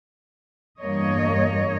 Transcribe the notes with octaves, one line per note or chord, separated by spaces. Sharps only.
E2 G2 A#3 C#5 D#5